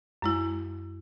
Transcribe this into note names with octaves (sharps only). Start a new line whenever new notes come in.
F#2 G#3 E4